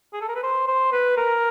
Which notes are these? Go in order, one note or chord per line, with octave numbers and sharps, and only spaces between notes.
G#4
A4
A#4
B4
C5
C5
B4
A#4